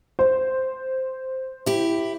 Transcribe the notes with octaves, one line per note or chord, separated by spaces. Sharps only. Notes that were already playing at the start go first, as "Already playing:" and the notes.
C5
E4 G4